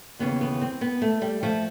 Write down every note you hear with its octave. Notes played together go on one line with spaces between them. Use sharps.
D#2 C#3 E3 B3
B3
C4
B3
A3
G3
F3 A3